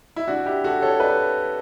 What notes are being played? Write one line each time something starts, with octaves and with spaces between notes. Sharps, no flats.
E4
D4 F#4
E4 G4
F#4 A4
A4 C#5
B4 D5